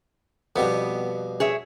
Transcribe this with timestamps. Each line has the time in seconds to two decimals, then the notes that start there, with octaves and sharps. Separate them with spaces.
0.56 F2 B2 G3 B3
1.40 G#4 C#5 E5